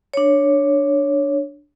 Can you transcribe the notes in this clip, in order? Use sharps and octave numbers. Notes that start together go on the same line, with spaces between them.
D4 C#5